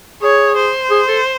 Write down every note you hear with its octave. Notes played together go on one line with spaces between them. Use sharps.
G#4 C#5
C5
G#4
A4